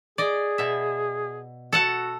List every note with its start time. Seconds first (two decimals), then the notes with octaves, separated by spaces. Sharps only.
0.18 G#4 D5 D#5
0.58 B2 E5
1.73 F#4 A4 F#5 A5